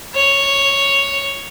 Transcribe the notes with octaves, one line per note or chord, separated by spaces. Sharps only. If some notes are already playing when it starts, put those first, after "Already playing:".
C#5